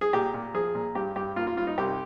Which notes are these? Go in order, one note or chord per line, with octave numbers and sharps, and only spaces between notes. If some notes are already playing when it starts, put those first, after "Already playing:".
G#4
A#2 G4
A#2
F3 G#4
A#2
G2 G4
G2 G4
A#3 F4
F4
G2 F4
D#4
C2 G4